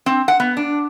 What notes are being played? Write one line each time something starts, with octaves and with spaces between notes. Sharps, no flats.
C4
F#5
B3
D4